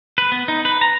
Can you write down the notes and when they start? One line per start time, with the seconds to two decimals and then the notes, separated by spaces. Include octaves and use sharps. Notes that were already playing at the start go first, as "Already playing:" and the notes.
0.18 B4
0.32 B3
0.48 D#4
0.65 B4
0.81 A#5